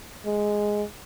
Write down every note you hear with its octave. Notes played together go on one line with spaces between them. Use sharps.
G#3